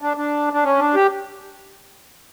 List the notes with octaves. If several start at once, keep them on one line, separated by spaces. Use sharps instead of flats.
D4
D4
D4
C#4
D4
G4